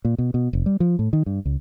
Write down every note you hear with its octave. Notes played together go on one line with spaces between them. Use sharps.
A#2
B2
B2
F1
G3
F3
A2
D#3
G2
C#2